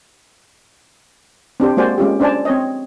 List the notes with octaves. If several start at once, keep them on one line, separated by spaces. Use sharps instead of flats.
C4 D4 G4 C5
G#3 A#3 F#4 C5 D5 G#5
G#3 C#4 F4 G4
C#4 D4 C5 D5 G#5 A5
C4 C#5 D#5